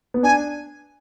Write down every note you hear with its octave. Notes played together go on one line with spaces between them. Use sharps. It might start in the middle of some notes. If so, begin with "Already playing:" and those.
B3
D4 G#5